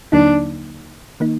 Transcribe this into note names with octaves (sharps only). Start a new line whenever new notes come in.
D#2 D3 F#3 A#3 D4 D#4
D#3 A#3 D#4